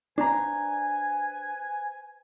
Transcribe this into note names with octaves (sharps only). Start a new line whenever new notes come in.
D4 B4 C5 G#5 A#5